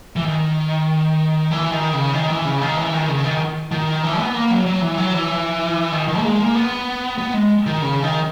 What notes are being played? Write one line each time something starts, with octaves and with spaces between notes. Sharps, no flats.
E3
D#3
E3
D#3
C#3
D#3
E3
C#3
D#3
E3
D#3
C#3
D#3
D#3
E3
B3
A#3
F#3
F#3
E3
F#3
E3
D#3
D#3
A#3
G#3
A#3
B3
B3
G#3
D#3
C#3
D#3